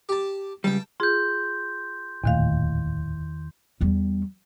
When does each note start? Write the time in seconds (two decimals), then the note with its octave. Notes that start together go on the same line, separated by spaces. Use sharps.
0.09 G4 A5
0.64 C#2 G3 G5 A5
1.00 F4 G#4 C6 G6
2.24 D1 E2 A#2 D#3 A3 F5
3.81 E2 G3